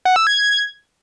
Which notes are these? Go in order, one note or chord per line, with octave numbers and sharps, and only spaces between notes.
F#5
E6
G#6